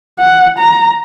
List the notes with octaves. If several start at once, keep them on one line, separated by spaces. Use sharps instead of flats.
F#5
A#5